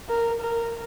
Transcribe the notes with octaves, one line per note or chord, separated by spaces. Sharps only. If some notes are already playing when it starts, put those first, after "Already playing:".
A#4
A#4